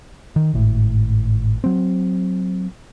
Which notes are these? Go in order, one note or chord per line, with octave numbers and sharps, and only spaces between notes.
D#3
G#1 A2
F#3 C4